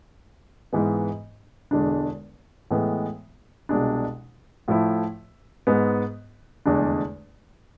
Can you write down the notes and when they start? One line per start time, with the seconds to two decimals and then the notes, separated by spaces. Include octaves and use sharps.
0.73 G#2 E3 G#3 B3
1.71 E1 E2 D3 G#3 D4
2.71 A2 E3 G#3 B3
3.69 C2 B2 G#3 D4
4.68 A2 F3 A3 E4
5.67 G#2 G#3 B3
6.66 F1 E2 D3 G#3 D4